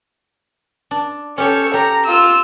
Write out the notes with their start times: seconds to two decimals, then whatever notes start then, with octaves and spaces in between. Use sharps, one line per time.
0.91 D4
1.38 C#4 G4 A4 C#5
1.74 G4 A#5
2.05 F4 E6